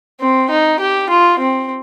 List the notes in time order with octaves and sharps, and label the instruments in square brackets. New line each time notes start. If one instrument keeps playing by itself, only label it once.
[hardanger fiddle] C4
D#4
G4
F4
C4